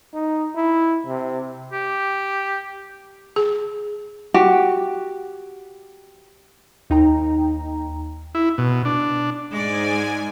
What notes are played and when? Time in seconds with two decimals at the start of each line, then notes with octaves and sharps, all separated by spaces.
0.14 D#4
0.56 E4
1.06 C3
1.73 G4
3.36 G#4
4.34 F#4 G4
6.90 D#2 D#4 G5 A#5
8.35 E4
8.58 B2
8.85 D4
9.50 G#2 G#3 D5 G#5